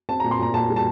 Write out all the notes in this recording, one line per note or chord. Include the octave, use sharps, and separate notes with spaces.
C4 A5
A#2 A#5
C6
A#2 A#5
A#2 A5
G3
A5